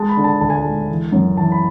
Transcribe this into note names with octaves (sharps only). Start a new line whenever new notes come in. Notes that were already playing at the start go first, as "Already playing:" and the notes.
Already playing: G#3 A5
B5
D3
A5
D2 A5
G#5
A5
G#3
E3
F#2
E3 A5
B5